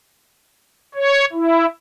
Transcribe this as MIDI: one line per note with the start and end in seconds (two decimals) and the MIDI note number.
0.95 1.25 73
1.33 1.66 64